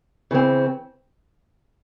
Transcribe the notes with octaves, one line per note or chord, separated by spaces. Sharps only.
C#3 E3 C4